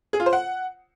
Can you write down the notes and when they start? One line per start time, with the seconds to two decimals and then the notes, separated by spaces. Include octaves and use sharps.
0.13 G#4
0.20 F4
0.26 C5
0.33 F#5